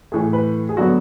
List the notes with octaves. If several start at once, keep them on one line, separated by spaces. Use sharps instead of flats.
A2 E3 A3 G#4
B4
G#4
D3 F#3 B3 F#4